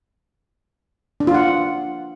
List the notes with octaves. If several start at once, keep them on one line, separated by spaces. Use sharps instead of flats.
D4
F4
F#5